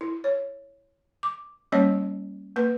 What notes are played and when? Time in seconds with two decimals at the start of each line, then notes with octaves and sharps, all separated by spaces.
0.01 E4
0.24 C#5
1.23 D6
1.72 G3 A#3 C#4 C#5 D#5
2.56 A#3 B4